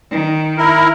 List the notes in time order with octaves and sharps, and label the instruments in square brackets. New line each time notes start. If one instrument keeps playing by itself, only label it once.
[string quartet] D#3
[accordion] E4 A#4